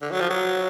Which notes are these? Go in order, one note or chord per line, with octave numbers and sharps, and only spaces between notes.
D3
F#3
F3
F#3